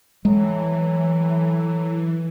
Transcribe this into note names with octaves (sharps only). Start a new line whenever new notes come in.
A2 E3 F#3 G#3